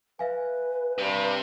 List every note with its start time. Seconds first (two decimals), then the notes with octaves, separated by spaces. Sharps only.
0.19 B4 E5 F5 G#5
0.99 G2 C3